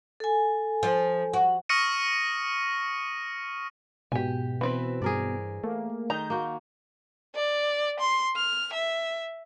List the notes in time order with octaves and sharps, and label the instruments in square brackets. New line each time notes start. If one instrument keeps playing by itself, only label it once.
[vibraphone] A4 G#5
[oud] F3
F#4
[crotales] C#6 D#6 F6 A#6 C#7 D#7
[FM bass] G#2 [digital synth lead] B2 [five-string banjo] G4 G#5
[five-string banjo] E3 C4 B4 [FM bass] B3
[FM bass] G2 [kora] G#4 A#4 D5
[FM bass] A3 [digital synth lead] A#3
[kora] D#3 D#4 [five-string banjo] A#5 [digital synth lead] G6
[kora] A#3 F#4
[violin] D5
C6
F6
E5